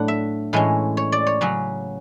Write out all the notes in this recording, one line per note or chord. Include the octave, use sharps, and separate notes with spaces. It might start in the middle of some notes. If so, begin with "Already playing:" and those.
Already playing: A2 F#3 A3 D4 F#5
E5
A2 E3 G#3 C#4
C#5
D5
C#5
C#3 F#3 C#4